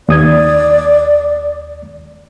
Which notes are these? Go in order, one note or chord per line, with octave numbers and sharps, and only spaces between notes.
D#2 D5 D#6 G#6